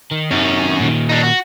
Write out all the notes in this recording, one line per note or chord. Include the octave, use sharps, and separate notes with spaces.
D#3
F#2 C3 D#3 C#4
A#2 D#3
D4 D#4
F#4